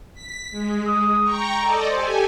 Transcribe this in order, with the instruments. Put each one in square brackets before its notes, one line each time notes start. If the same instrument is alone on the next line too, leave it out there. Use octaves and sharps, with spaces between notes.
[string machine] B6
G#3
[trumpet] D#6
[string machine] G5 A#5 C#6
[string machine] A4 D5 D#5 [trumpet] A#5
[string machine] G4 A4 G#5 [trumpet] C5